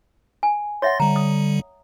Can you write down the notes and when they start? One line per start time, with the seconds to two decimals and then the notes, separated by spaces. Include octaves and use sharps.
0.43 G#5
0.82 C#5 E5 F#5 C6 A6 A#6
1.00 D3 G3 A#5
1.16 D#6